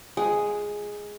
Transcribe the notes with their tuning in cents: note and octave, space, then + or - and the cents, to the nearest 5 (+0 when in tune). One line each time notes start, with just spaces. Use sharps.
G#3 +0 G#4 +0